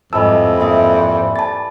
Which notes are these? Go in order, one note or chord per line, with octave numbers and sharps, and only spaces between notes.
F2 G#2 E3 G3 D#5 A5 E6
A#3 D5 E5 B5
A5 A6